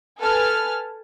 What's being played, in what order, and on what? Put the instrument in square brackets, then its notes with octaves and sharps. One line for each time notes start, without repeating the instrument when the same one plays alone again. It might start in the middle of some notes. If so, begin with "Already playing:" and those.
[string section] A4 B4 G#5 A5 F6